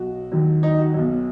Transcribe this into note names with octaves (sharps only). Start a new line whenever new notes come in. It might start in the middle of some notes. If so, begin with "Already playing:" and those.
Already playing: B1 B2 F#3 F#4
D#2 D#3 F#3
D#4
F#4
B1 B2 F#3